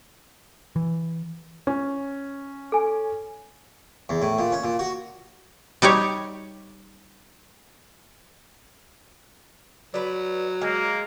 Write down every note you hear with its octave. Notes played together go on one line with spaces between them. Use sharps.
E3
C#4
A4 G#5
E2
A2
A#2
C#4
A#2
F#4
G3 D#4 G4 C#5
F#3 B4 D5
G#3 A#3